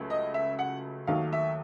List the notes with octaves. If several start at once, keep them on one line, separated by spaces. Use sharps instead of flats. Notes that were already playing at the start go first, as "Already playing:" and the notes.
Already playing: C#2 C#3 F#3 A3
D#5
E5
F#5
D#2 D#3 F#3 A3 F5
E5